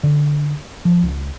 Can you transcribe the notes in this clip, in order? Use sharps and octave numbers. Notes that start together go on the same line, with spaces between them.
D3
F3
C#2